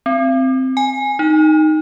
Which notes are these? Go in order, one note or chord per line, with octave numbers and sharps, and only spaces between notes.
C4
G#5
D#4